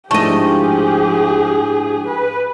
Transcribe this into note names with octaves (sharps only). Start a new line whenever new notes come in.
G#2 F3 A3 D4 E4 G4 G#4 D#5
B4